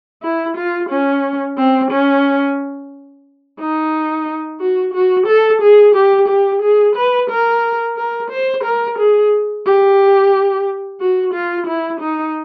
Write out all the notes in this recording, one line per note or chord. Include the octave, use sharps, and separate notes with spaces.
E4
F4
C#4
C4
C#4
D#4
F#4
F#4
A4
G#4
G4
G4
G#4
B4
A#4
A#4
C5
A#4
G#4
G4
F#4
F4
E4
D#4